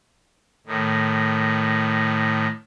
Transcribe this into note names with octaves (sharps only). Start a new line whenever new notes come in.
A2 D#3